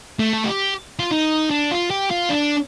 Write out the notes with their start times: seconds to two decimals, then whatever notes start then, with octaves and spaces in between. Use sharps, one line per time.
0.19 A3
0.33 A4
0.45 G4
0.99 F4
1.11 D#4
1.50 D4
1.71 F4
1.91 G4
2.11 F4
2.30 D4